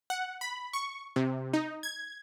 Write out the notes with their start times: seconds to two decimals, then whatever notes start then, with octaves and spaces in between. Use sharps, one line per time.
0.10 F#5
0.41 B5
0.73 C#6
1.16 C3
1.54 D#4
1.83 G#6